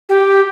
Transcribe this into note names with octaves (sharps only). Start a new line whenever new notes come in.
G4